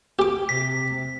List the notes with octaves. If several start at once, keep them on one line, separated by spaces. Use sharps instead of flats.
G4 D6
C3 B6